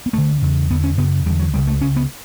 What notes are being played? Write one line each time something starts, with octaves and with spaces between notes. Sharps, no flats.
B3
D2 D3 A3
E2 C#3
E2 D3 B3
C#4
F#2 C#3 B3
E2 D3 G3
F#3
C#2 C#3 G3
A3
C#2 C#3 C#4
B3